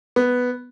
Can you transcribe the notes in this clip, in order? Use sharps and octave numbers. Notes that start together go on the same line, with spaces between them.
B3